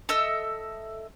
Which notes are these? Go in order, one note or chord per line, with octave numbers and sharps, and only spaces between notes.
A4 D#5 E5 E6